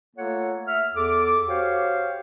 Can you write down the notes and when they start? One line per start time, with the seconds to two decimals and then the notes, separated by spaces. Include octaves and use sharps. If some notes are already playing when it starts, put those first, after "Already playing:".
0.16 A3 A#3 F4 A4 C#5 F#5
0.66 E5 F6
0.95 E2 A4 D6
1.48 F#4 G4 C5 C#5 F5